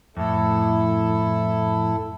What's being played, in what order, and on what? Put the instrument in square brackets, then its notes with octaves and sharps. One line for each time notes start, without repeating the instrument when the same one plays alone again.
[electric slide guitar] F2 A2 [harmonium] E4 A4